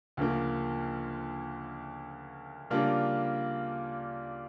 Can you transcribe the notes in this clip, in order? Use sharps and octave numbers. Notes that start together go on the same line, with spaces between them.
D2 C#3 F3 A#3
C#3 G3 A#3 D4 F4